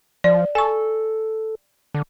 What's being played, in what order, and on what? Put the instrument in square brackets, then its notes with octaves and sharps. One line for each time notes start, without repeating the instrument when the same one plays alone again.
[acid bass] F3 [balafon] D5
[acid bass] A4 [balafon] G#5 C#6
[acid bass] D3